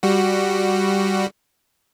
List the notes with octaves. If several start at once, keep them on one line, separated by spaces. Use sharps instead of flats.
G3 F#4